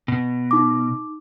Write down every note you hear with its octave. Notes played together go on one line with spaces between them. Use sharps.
B2
D#4 D6